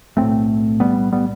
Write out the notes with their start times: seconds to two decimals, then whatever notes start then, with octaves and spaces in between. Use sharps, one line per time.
0.17 B1 A2 A3 C4
0.80 G3 B3
1.12 G3 B3